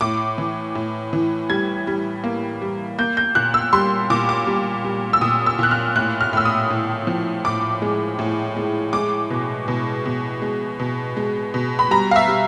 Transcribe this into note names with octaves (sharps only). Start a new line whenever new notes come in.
A2 D6
E3
A2
E3
G3 G#6
G3
A#3
G3
A#3 G6
G6
A#2 F#6
E6
G3 C6
A#2 D6
D6
G3
G3
E6
A#2 D#6
E6
A#2 F#6
F6
A2 F#6
F6
A2 E6
D#6
A2
F3
A2 D6
G#3
A2
G#3
G#3 D6
B2
B2
B2
G#3
B2
G#3
B2
B5
G3 A#5
F5
E5
G3